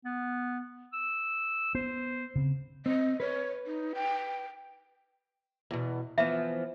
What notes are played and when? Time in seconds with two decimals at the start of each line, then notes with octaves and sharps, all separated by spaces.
0.05 B3
0.93 E6
1.75 B3 C5
2.36 C#3 C4
2.86 C4 D#5
3.20 B4 C#5
3.66 D#4
3.95 G5
5.71 E2 B2
6.18 E3 F3 B3 E5